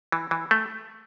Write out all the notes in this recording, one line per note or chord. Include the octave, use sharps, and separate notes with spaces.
E3
E3
A3